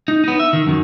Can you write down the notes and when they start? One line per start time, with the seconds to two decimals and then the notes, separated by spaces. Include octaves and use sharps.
0.08 D#4
0.24 B3 D#4
0.40 E5
0.53 D#3
0.67 F#2 D#3